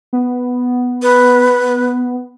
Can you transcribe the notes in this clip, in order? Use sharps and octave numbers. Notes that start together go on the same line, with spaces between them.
B3
B4